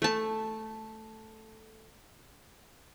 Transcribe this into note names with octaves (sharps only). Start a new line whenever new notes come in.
A3 A5